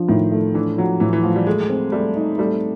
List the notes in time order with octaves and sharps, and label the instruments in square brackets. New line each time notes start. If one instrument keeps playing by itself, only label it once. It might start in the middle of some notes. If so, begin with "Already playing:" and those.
Already playing: [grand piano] F3 D4
[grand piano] A2 [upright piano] D#3
[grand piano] A3
[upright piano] E3 [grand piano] D4
[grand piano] F3 [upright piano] F#3
[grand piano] A2 [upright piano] E3
[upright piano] E3
[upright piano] F3 [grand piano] A3
[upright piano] G3
[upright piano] G#3 [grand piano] A3
[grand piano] C4
[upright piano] G3 [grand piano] A3
[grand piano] D#4
[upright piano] G3 [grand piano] A3